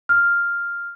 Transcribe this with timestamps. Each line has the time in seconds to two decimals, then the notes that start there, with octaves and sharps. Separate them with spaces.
0.09 F6